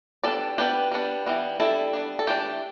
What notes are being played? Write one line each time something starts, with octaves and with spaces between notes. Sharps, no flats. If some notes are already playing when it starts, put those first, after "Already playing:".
G3 B3 D4 A4 D5
G3 B3 D4 G4 B4
G3 B3 D4
E3 G3 B3
G3 D4 E4 A4
G3 B3 D4
A4
E3 A3 D4 G4